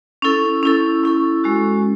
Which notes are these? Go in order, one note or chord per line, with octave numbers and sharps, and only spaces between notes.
C#4 E4 A4
C#4 E4 A4
C#4 E4 A4
G#3 C#4 F#4